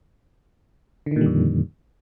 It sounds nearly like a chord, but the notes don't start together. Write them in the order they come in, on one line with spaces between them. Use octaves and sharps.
D3 D#3 A#2 G3 F2